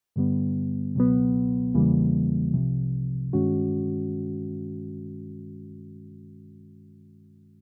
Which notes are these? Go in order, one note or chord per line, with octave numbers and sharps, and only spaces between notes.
G2 D3 G3 B3
C#2 B2 F#3 B3
E2 C#3 E3 G3 A#3
C2 C3 F3
G2 D#3 G#3 C#4 F#4